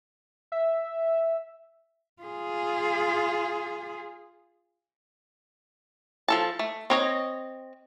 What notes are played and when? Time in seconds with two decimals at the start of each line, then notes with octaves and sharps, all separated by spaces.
0.52 E5
2.22 F4 G#4
6.28 F3 A4 A5
6.59 A3
6.90 C4 C#5 D#5